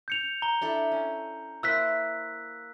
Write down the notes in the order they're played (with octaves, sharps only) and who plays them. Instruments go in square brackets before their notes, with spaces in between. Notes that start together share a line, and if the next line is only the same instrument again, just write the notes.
[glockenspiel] G6 C#7 F7
A#5 G7
[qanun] D4 E4 A4
C#4
[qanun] A#3 E4 C5 [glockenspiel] E6 F#6 B6